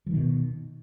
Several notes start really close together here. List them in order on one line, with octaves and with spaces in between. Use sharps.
F3 D#3 B2